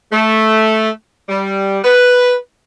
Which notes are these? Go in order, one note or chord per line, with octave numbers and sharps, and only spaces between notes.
A3
G3
B4